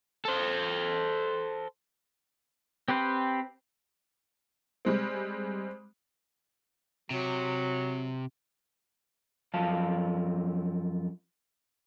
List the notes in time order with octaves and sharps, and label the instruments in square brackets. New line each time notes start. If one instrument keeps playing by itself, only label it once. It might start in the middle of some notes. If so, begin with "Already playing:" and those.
[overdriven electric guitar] A4 C5
[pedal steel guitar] C4 G4 B4 C5
[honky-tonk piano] G3 G#3 C4
[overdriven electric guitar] C3 [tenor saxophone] F#3
[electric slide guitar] F#2 F3 F5 A5